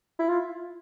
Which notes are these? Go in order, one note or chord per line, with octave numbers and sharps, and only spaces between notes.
E4
F4